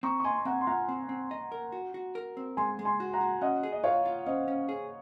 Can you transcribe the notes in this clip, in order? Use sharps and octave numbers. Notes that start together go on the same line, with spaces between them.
C4 A#5 C#6
C#6
D#5 G#5 C6
C6
C4 F#5 A#5
C6
F4 F#5 A#5
C4
C4
D#5
A#4
F#4
F#4
A#4
C4
G#3 G#5 C6
G#3
G#5 C6
F#4
F#5 A#5
F#4
C#4 D#5 F#5
G#4
D#5
F4 C#5 F5
F4
C#4 C5 D#5
C#4
G#4